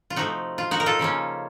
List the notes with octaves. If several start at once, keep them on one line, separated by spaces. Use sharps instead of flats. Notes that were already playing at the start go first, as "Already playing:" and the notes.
F4
C3 F3 A3 D#4 F#4
F4
D#4 F#4
A#4
F4 A4
C#3 F3 A#3 C#4